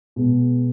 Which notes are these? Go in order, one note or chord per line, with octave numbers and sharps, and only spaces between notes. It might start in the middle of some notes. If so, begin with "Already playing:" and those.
B2 G#3 B3